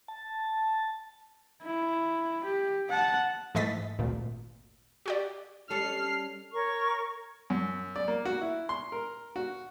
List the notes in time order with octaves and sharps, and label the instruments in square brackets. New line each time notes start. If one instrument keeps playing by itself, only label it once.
[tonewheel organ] A5
[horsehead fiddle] E4
G4
F#5 A5
[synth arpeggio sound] G#2 E3 A3 D#5 A6 B6
G#1 D2 A#2
F#4 G4 D5
[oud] G3 C#4 A4 [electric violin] F6 C7
[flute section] A#4 C#5 C#6
[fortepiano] F#2
D5
A#3
F#4
E4
C6
A#4
F#4